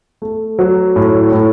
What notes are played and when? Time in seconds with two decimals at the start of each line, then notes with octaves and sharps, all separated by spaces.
0.22 A3
0.59 F#3
0.96 A2
1.32 A2